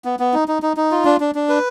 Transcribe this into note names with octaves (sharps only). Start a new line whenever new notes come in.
B3
B3
D#4
D#4
D#4
D#4
F4
D4
D4
D4
B4